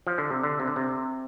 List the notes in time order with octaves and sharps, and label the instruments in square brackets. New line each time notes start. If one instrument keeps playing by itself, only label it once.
[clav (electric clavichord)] F3
D3
C3
D3
C3
D3
C3